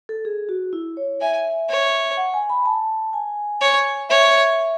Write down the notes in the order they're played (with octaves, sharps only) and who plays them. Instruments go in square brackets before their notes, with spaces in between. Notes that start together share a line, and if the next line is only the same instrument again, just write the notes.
[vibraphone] A4
G#4
F#4
E4
C#5
[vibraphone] E5 [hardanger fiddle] G#5
[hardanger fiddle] C#5
[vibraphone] F#5
G#5
B5
A5
G#5
[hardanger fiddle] C#5
[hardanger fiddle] C#5 [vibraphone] E5